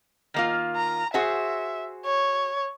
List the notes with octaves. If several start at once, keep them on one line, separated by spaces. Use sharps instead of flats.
D#3 A#3 F4
A#5
F#4 G#4 C5 E5
C#5